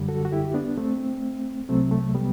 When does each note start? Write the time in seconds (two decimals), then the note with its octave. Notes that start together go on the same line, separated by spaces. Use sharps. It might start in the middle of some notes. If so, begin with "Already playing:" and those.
Already playing: F#2 D3 G3
0.08 F#4 A4
0.25 F#4
0.32 E4 G4
0.54 B3 D4
0.78 A3 C4
1.69 C2 C3 F#3 A3 C4
1.91 A3
2.15 G3 B3